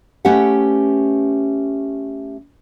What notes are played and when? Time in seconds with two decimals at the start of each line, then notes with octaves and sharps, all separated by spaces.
0.25 A3 C#4 G4 B4 E5 F#5